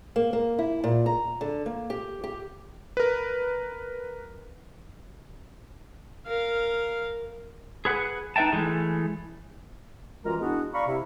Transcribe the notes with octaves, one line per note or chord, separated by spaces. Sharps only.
A#3
A#3
E4
A#2
A#5
D3
A#3
G4
G4
A#4 B4
A#4 F5
G#4 B4 F#5
D#4 B4 E5 G5 A5
E3 G#3 A3
F#2 E3 G#3 F4 A#4 A#5
G#3 B3 D4 E4 F#4
D5 F5 A#5 B5 C#6
C3 E4